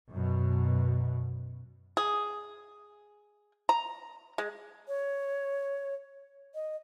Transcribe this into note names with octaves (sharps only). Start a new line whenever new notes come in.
F#2 B2
G#4
A#5
G#3
C#5
D#5